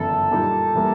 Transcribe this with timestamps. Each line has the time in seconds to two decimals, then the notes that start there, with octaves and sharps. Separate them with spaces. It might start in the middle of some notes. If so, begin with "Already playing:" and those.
Already playing: G1 F#2 C#3 E3 A4
0.31 A#2 G3 A#3 D#4
0.75 E3 G3 A#3